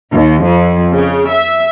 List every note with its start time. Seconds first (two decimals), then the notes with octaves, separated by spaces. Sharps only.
0.12 D#2
0.46 F2
0.94 C#3
1.32 E5